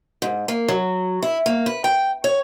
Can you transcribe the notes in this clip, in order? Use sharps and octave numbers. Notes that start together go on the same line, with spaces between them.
G#2
A#3
F#3
E4
A#3
B4
G5
C#5